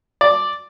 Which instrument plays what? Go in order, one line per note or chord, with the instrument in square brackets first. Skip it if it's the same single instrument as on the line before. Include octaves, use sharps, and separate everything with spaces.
[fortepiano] D5